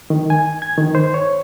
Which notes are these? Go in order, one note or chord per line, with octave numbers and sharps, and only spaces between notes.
D#3
G#5
G#6
D#3
C5
C#5